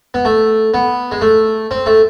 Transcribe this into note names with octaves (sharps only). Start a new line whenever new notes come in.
B3
A3
B3
G#3
A3
C4
A3